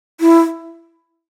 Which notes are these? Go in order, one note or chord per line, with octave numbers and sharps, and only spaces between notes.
E4